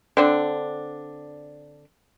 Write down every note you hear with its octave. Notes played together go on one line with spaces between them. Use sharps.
D3 C4 D4